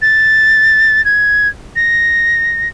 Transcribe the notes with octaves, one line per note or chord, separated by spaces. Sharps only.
A6
G#6
A#6